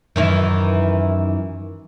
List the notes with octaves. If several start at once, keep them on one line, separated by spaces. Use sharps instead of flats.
F#2 D#3 E3